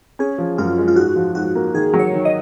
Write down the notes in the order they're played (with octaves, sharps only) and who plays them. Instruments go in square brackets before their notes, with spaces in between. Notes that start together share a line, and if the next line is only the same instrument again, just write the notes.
[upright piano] C#4 [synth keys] G#4
[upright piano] F3
[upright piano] F#2 [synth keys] F4
[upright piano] G#3
[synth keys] F4
[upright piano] G#2 [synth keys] F#4
[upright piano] F3
[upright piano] G#2 [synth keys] F#4
[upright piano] A#3
[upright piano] D#3 [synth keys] G#4
[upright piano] F#3
[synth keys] C#5
[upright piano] D#3
[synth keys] D#5